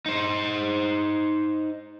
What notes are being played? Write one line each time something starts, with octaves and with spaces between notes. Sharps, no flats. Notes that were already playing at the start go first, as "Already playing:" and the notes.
D#4 C5